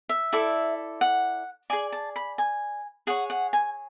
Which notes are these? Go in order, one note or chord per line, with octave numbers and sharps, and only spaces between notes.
E5
E4 A4 D5
F#5
G#4 D5 G#5
A5
B5
G#5
G#4 C#5 F#5
F#5
G#5